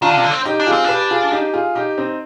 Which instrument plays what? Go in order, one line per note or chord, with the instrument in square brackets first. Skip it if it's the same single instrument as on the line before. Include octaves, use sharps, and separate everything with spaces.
[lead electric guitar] D#3 [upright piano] D4 F4
[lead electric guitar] D3
C3
D3
C4
[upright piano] D#4 G4
[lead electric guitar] D4
[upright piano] F4 G#4
[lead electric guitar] C4
[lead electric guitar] D4 [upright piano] G4 B4
[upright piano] F4 G#4
D#4 G4
F4 G#4
D#4 G4
C4 D#4